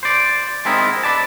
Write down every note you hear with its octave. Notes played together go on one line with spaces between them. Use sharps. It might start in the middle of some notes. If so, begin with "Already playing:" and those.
C5 D5
G#3 B3 C4 D#4 E4 A#4
B4 D5 A5